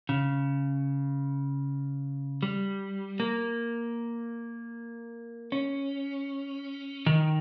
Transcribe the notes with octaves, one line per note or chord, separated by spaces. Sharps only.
C#3
G3
A#3
C#4
D#3